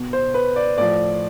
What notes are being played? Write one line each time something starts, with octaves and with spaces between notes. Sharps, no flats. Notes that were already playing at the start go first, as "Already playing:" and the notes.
Already playing: B2
C5
B4
D5
A2 F3 D5